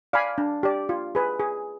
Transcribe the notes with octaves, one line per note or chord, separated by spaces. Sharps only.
D5 F5 G#5 B5
D4
G4 D5
F4
G#4 B4
G#4